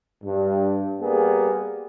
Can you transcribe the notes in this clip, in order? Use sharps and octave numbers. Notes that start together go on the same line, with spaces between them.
G2
G3 A#3 B3 G#4